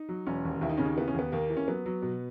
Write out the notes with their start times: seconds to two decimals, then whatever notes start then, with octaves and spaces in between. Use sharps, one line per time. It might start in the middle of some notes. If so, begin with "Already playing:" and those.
Already playing: D#4
0.09 F#3
0.26 E1 C#4
0.45 D#2
0.61 D#2 E4
0.69 D#4
0.77 C#3 C#4
0.85 D#4
0.96 E3 B3
1.08 C#4
1.14 D#2 B3
1.32 D#2 A#3
1.49 E3
1.57 C#4
1.68 F#3 B3
1.86 F#3
2.02 B2